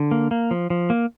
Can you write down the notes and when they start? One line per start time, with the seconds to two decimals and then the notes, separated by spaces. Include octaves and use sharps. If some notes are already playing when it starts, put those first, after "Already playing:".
Already playing: D3
0.11 A#3
0.31 A#3
0.51 F3
0.70 F3
0.90 A#3